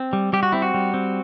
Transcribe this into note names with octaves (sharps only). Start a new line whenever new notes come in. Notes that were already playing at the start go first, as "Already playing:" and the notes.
Already playing: C4
G3
G3 G4
F#4
C4 E4
F#4
G3
C4